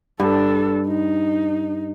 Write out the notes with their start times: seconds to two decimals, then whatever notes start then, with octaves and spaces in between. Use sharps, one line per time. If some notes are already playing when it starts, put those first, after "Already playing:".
0.20 G2 D4 A4
0.87 D#4